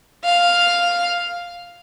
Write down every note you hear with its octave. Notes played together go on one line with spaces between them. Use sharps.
F5